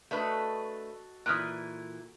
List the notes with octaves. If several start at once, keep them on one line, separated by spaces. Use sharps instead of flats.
A3 D4 F#4 A4 B4 D#5
A#2 E3 D#6 F6 F#6